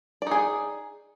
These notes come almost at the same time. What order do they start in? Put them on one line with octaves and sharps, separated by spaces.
D5 D#4 G#4